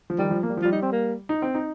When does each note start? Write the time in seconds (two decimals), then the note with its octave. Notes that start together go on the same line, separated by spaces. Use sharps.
0.10 F3
0.18 D#3 G3
0.31 F3
0.43 A#3
0.50 G3
0.57 F3
0.62 G3 F4
0.72 D#4
0.82 C4
0.92 A#3
1.29 D#4
1.42 C4
1.55 D#4